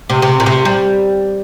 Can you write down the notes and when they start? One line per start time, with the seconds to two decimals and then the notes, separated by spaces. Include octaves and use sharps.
0.09 C3
0.22 C3
0.40 A#2
0.46 C3
0.65 G3